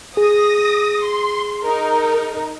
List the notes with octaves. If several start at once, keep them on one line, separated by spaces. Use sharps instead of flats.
G#4 D#6 A#6
C6
D#4 A#4